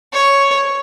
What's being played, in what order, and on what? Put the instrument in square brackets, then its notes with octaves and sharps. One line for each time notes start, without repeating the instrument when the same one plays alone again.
[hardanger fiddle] C#5